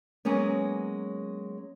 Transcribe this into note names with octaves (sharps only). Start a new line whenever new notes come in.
F#3 G#3 A#3 B3 C#4